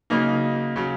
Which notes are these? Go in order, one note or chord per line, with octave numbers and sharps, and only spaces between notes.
C#3 F#3 A#3 D#4
C#3 F#3